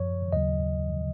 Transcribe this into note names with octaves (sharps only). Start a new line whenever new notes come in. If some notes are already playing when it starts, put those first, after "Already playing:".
Already playing: F#2 F3 C#5
D#2 C#3 F#3 D#5